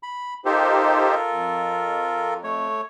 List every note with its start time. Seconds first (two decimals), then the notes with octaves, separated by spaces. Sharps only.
0.03 B5
0.45 D#4 F4 G4 A4 A#4 C5
1.30 F2
2.44 A3 C#5